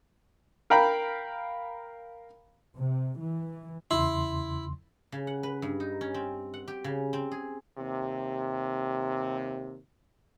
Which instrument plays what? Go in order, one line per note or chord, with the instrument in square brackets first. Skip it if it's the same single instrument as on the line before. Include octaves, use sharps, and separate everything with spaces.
[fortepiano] A#4 F5 G5 A#5 B5
[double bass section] C3
E3
[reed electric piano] E2 C#3 C6 [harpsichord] E4
[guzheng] C#3
F#5
B4
G2
D#4
C#4
C4
F#5
G4
C#3
C4
G#4
[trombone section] D#2 C3